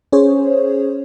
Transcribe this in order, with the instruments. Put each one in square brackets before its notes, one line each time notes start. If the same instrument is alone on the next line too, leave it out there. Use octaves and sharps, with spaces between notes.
[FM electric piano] C#4 G#4 C5 C#5